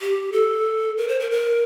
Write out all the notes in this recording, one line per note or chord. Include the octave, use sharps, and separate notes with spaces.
G4
A4
A#4
C5
A#4
A#4